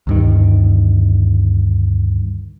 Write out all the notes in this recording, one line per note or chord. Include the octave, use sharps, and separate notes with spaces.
D2 G2 D#3